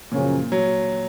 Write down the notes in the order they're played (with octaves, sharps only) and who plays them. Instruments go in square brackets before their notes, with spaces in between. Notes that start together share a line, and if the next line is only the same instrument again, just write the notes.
[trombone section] F#2 C#3 F3 A#3 C#4 [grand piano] A#2
[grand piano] F#3